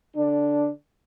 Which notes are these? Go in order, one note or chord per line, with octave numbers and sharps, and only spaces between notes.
D3 D4